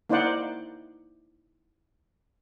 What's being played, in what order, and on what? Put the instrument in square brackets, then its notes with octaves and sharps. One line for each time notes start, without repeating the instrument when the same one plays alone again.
[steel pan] A#3 D#4 E4 C5 D5 F#5